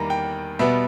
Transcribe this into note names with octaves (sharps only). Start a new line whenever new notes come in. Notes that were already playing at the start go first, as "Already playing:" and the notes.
Already playing: E2 D#3 G3 A#3 A#5
G5
B2 G3 B3 E5